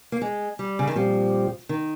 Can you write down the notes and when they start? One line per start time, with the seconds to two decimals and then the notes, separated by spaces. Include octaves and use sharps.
0.12 A#3
0.22 G#3
0.59 G3
0.79 C#3
0.88 D#3
0.96 A#2 F3 G3 C4 G4
1.69 D#3